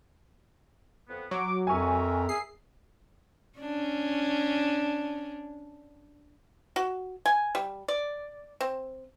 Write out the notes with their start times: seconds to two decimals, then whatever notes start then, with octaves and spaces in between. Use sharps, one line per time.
1.08 F2 B3
1.31 F#3 C#6 D6
1.67 F2 A#4 E5 G#5 C#6
2.29 G#4 C7
3.59 C#4 D4
6.76 F#4
7.26 G#5
7.55 G3
7.88 D5
8.61 C4